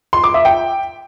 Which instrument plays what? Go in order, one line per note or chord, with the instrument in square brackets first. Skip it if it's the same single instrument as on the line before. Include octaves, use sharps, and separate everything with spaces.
[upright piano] C6
D6
E5
G5